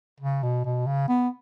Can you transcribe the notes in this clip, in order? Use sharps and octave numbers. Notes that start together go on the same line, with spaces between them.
C#3
B2
B2
C#3
B3